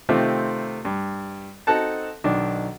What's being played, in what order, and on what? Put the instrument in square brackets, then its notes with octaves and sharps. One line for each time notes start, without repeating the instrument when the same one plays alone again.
[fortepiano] C3 D#3 A3 C4 F4 G4
G2
C4 D#4 F#4 A4 F#5 A5
B1 D#3 D4